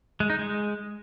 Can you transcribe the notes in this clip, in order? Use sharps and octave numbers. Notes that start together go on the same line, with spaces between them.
G#3
D#4
G#3